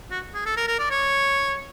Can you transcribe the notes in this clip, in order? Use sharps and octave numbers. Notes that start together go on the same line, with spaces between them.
F#4
G#4
A4
A#4
A#4
D5
C#5